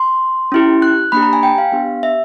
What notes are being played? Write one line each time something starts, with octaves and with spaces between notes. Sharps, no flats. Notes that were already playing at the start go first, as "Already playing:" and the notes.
Already playing: C6
C#4 E4 G4
F#6
A#3 D4 G4 B5
A#5
G#5
G5
F5
B3 D4 G4
E5